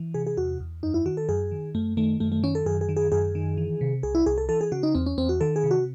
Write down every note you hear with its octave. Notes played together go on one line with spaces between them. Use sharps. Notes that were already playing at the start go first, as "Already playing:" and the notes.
Already playing: E3
C3 G#4
G#4
E2 F#4
E2
F#2 D#4
E4
D#3 F#4
A4
F#2 G#4
D#3
F#2 A3
D#3 A3
F#2 A3
A3
D#3 C#4
A4
F#2 G#4
G#4
D#3
G#4
F#2 G#4
D#3
E3
C3
C2 G#4
E4
C2 G#4
A4
E3 A4
G#4
C#3 F#4
D#4
E2 C4
C#4
E2 C4
F#4
D#3 A4
G#4
C3
F#4